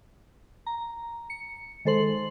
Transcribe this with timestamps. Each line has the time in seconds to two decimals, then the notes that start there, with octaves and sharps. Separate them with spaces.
0.66 A#5
1.30 C#7
1.85 D#3 G#3 A4 C5 C6 F#7